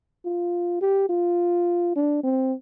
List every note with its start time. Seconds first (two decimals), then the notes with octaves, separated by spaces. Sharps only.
0.25 F4
0.81 G4
1.09 F4
1.96 D4
2.23 C4